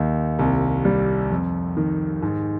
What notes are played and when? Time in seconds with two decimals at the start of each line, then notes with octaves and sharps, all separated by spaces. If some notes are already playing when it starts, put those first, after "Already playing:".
Already playing: D#2 D#4
0.39 C2
0.85 G3
1.31 F2
1.77 D#3
2.22 G#2